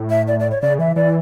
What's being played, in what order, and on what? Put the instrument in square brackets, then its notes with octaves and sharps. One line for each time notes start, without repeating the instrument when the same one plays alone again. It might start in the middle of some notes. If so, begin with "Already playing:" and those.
Already playing: [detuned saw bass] A2
[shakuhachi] E5
D5
D5
C#5
[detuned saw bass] C#3 [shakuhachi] D5
[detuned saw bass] E3 [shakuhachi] E5
[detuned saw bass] E3 [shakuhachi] D5